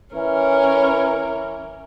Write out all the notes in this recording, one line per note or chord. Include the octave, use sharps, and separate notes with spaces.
E3 C#4 A#4